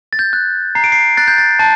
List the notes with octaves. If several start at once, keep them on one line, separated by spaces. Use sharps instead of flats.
A6
G6
F#6
A#5 C7
D7
C7
F#6 A6
G6
A6
A5 A6